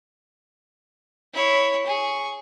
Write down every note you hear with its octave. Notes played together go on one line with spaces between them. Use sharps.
E4 C#5
G#4 C#6